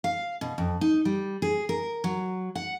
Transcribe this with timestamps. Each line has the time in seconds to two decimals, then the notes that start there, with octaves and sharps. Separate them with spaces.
0.04 F5
0.41 B2
0.58 F2
0.81 D#4
1.05 G3
1.42 G#4
1.69 A#4
2.04 F#3
2.55 F#5